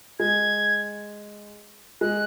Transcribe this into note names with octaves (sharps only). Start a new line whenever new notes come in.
G#3 G#6
G#3 F#6